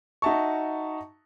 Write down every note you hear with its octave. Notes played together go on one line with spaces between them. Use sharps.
D#4 F#4 E5 A5 A#5 C#6